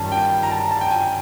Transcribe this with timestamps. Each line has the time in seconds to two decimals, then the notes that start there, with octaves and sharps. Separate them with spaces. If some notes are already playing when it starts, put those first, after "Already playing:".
Already playing: G2 D#3 G3 C#4 A5
0.12 G5
0.43 A#5
0.51 A5
0.71 A5
0.81 G5
0.91 G#5